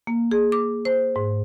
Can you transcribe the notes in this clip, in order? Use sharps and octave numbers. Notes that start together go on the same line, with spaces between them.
A#3
G#4
D6
C5
G#2